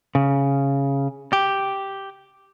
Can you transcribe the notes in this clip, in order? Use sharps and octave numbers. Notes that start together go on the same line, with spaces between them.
C#3
G4